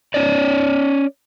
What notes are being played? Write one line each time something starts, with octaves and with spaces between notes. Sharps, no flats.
C#4 C#5 D5